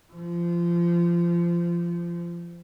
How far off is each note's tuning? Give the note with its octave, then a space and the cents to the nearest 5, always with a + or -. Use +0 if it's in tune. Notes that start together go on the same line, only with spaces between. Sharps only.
F3 -25